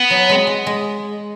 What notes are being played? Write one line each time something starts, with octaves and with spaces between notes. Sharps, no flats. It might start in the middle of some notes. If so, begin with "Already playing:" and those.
Already playing: B3
F#3
G#3
G#3
G#3